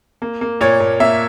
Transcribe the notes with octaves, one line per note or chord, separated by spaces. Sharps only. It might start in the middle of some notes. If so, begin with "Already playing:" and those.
A#3
A#3
A#2 C#5
A#2
A#3 E5